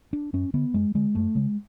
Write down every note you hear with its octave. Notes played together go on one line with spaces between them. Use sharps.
D4
F#2 C#4
D3 B3
F#2 G#3
D3 G#3
F#2 A3
C#3 G#3